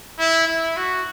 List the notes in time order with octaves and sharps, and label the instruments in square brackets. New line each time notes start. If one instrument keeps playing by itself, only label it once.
[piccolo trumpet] E4
E4
F#4